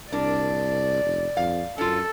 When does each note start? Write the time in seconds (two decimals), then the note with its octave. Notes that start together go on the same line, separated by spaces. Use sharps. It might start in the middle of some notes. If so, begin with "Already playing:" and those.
0.12 C2 D4 A#4 D5
1.03 F1
1.37 F2 F5
1.78 F#2 C#4 F4 A4